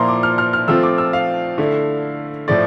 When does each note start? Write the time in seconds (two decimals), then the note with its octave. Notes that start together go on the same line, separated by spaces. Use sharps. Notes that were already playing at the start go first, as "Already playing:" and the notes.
Already playing: A#2 F3 A#3 E4 A#5 C6
0.08 D6
0.23 F6
0.38 F6
0.53 F6
0.68 F3 A3 C4 F4 E6
0.83 D6
0.98 E6
1.13 F5
1.58 D3 A3 E4
2.48 A2 F3 A3 D5